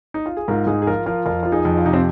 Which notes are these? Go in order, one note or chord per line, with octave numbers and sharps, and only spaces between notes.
D#4
F4
G#4
G#2 F4 A#4
G#2 D#4 G#4
G#4
F3 F4 A#4
F3 F4 A#4
F2 F4 A#4
F3 F4
D#4 G#4
F2
F4
C3 D#4
C4 F4